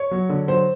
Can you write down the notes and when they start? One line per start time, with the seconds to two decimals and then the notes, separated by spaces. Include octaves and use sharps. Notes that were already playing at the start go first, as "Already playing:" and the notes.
Already playing: C#5
0.11 F#3
0.29 D3
0.48 F#3 C5